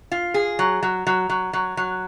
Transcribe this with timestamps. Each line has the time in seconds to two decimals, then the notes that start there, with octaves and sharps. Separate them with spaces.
0.12 F4
0.34 G#4
0.59 F#3
0.83 F#3
1.07 F#3
1.30 F#3
1.53 F#3
1.77 F#3